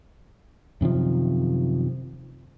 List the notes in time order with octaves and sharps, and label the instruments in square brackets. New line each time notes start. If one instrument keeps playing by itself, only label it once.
[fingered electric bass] F#2 C3 D#3 F3